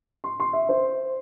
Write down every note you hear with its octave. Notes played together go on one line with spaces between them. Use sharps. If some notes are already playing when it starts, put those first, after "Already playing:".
C6
C6
E5
C5